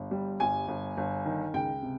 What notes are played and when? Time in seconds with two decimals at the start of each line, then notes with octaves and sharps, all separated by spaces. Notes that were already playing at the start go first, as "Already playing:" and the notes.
Already playing: G1
0.11 G3
0.40 G1 G#5
0.68 G1
0.97 G1
1.25 D#3
1.54 C#2 G5
1.82 C3